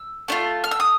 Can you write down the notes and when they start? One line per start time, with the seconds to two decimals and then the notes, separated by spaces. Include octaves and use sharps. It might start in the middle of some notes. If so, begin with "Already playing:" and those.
Already playing: E6
0.28 A3 D4 F4
0.64 F6
0.71 E6
0.80 D#6